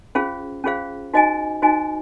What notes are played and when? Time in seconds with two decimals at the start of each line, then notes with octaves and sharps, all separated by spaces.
0.15 C#4 F4 G#4 C5 F5
0.64 C#4 F4 G#4 C5 F5
1.14 D#4 F#4 C5 D#5 G#5
1.62 D#4 F#4 C5 D#5 G#5